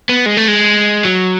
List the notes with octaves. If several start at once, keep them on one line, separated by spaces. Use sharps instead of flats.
B3
G#3
A3
G#3
F#3